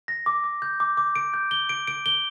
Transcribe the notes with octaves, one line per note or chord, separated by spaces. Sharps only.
A#6
D6
D6
G6
D6
D6
D7
G6
G7
D7
D7
G7